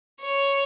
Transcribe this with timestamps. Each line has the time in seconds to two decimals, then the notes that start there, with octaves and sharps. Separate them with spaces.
0.22 C#5